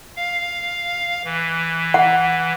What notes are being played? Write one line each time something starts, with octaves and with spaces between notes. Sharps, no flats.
F5
E3
F#5